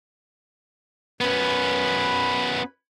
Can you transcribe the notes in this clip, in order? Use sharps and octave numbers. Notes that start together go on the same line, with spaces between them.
F#2 B3 C#4 B4 B5